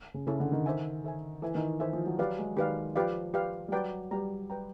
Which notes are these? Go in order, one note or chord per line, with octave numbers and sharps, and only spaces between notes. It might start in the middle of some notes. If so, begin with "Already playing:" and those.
C#3
C#3 C#4 E4 A4 C#5
D3
D#3
A4 C5 E5 G#5
A4 C5 E5 G#5
E3 A4 C5 E5 G#5
D#3
E3 A4 C5 E5 G#5
F3
F#3
F#3 G4 B4 D5 F5
G#3
D#3 G4 B4 D5 F5
F3 G4 B4 D5 F5
G4 B4 D5 F5
G3
F#3 B4 D5 G5 A#5
G3 B4 D5 G5 A#5
B4 D5 G5 A#5